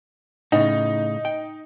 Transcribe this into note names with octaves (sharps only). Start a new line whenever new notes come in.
A2 C#3 D#4
G5